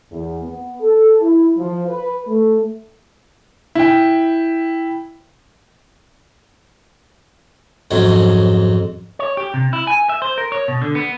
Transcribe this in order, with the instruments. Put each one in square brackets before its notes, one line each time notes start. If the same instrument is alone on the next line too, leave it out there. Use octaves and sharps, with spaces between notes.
[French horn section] E2
B3
A4
E4
F3
B4
A3
[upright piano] E4 G5
[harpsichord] F2 G#2 C#3 F#3
[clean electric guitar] C#5
G4
C3
E4
G#5
E5
C5
A#4
C#5
B2
D3
B3